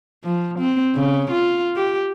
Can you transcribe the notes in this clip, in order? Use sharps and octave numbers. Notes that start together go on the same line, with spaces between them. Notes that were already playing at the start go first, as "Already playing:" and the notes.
F3
C4
C#3
F4
G4